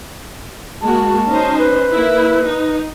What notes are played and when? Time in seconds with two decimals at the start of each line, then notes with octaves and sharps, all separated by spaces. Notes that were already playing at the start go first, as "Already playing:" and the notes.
0.81 G#3 A#3 F#4 A5
1.29 C#4 D#4 C5
1.58 B4
1.93 A#3 E4
2.46 D#4